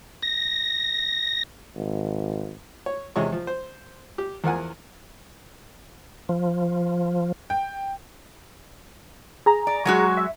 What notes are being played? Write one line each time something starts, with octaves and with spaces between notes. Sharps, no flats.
A#6
G#1
C#5
E2 C3 G#3 C#5 C#6
F3
C5
G4
E2 F3 A#4 F#5 G#5
F3
G5
G#4 A#5
D5
F#3 G#3 F#4
E5